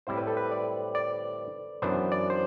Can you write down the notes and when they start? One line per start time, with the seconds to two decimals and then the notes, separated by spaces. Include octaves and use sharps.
0.07 A2 G3 C4 E4 C5
0.17 B4
0.27 A4
0.37 B4
0.52 D5
0.95 D5
1.82 F#2 E3 B3 D4 C5
2.12 D5
2.30 C5